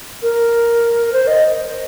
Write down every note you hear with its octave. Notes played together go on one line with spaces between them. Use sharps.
A#4
C5
D#5